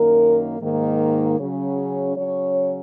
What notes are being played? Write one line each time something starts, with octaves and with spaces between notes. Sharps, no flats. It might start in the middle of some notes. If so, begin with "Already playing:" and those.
Already playing: F#2 D#3 A#3 A#4
G#2 D#3 A#3
C#3 F#3 C#4
C#3 F#3 C#4 C#5